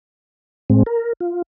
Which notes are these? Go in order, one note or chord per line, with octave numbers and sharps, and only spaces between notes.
A2 G#3 C4
A#4
F4